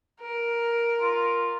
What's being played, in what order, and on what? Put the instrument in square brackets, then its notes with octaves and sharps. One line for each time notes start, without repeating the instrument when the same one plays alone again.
[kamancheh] A#4
[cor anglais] F4